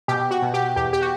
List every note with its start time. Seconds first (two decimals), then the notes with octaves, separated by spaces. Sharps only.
0.08 B2 G4
0.31 F#4
0.42 B2
0.54 G4
0.76 E2 G4
0.93 G4
1.02 F#4